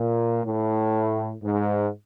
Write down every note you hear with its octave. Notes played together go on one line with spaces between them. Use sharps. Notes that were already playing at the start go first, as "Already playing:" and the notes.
Already playing: A#2
A2
G#2